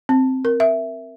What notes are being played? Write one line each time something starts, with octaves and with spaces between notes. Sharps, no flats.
C4
A#4
E5